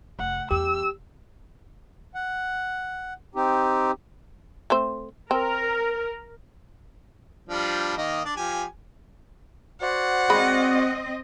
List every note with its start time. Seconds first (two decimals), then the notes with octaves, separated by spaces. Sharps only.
0.19 F1 F#5
0.51 E2 G4 E6
2.15 F#5
3.35 C4 D#4 G4
4.70 A3 C4 C5
5.31 C4 A#4
7.49 F3 G3 D4
7.97 D#3 A#3 D#5
8.25 D4 D5
8.36 F3 G4 G#5
9.82 F#4 C5 D5 F#5
10.30 G#3 C4 D#5 B5